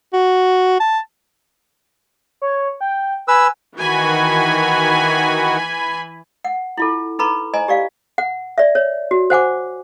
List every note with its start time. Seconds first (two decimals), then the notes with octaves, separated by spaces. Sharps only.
0.13 F#4
0.80 A5
2.42 C#5
2.81 G5
3.28 B4 G#5 E6
3.77 D#3 E3 F#4 G#5 B5
6.44 F#5
6.77 E4 F4 A4
7.19 D#4 A4 B4 A#5 B5 C#6
7.54 C5 D#5 G#5 A#5
7.68 G4 D5 F5
8.18 F#5
8.58 D5 E5
8.75 C#5
9.11 F#4
9.30 C5 F#5 G#5 D6